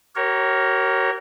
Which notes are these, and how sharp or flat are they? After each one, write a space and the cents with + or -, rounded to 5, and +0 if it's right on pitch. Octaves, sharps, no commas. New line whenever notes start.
G4 -45 A#4 +0 C#5 -20